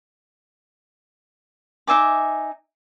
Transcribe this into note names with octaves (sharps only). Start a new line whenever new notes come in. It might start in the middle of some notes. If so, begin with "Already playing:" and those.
D#4 E5 G#5 D6